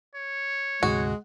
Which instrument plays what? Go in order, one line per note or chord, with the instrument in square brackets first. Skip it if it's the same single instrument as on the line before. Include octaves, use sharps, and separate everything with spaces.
[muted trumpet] C#5
[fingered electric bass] D2 G#2 C3 [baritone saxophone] G#3 [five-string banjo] F#4